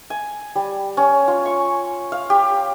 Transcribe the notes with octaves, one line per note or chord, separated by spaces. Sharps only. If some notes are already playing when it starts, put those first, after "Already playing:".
G#5
G3
C#4
F4
C#6
F5
G4